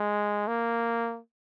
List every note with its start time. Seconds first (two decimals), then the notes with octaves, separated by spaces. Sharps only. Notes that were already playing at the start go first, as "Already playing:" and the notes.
Already playing: G#3
0.47 A#3